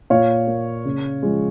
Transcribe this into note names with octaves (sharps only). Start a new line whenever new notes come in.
A#2 C#5 F5
A#3
C#3
F3 G#3